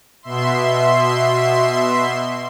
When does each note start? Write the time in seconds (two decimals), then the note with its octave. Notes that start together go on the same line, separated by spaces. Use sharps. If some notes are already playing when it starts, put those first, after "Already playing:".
0.23 B2 E5 C6